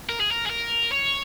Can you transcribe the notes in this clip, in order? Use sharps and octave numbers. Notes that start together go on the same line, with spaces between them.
A#4
G#4
A#4
G#4
A#4
C#5